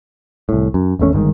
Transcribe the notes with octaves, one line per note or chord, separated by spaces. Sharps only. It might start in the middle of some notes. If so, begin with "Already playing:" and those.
C2 A2
F#2
G#1 E2 A3 C#4
G1 G#2 C3 D#3